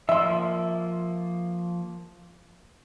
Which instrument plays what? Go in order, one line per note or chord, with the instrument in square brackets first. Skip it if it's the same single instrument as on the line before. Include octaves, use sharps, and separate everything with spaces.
[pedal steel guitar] F3 A#3 [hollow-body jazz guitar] E5 C6